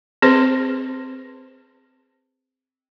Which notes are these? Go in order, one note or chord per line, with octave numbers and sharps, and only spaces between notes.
C4 G#4 B4 C5 C6